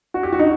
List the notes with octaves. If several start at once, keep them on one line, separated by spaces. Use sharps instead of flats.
F#4
G4
F#4
D#4